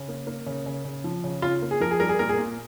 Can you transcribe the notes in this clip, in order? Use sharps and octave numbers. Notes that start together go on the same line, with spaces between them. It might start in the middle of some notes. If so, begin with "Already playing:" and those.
Already playing: C#3
A#3
A#3
C#3
C#3
C#3
F3
C#3
C#3 F4
A#3
G#4
F3 A#4
G#4
G3 A#4
G#4
A#2 A#4
G#4
A#2